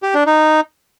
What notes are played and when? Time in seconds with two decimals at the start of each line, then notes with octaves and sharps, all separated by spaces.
0.03 G4
0.15 D4
0.27 D#4